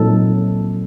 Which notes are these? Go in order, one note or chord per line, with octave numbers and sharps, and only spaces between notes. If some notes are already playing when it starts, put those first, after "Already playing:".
Already playing: A#2 F#3 C4 D#4 A4